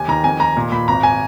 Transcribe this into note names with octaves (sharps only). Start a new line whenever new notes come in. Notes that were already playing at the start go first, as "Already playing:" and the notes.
Already playing: D#2 G#5
D#3 A#5
F2 G#5
D#3 A#5
A#2
A#2 B5
G#1 A#5
G#5